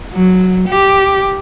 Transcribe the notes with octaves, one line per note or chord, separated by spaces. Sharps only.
F#3
G4